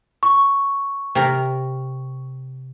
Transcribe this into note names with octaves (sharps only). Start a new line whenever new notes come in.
C#6
C3 A#4